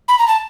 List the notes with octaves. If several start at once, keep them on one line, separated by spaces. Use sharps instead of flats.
B5
A#5
A5